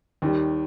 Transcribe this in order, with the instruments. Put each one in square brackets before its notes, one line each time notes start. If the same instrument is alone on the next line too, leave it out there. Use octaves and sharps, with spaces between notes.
[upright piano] D#2 D#3 G3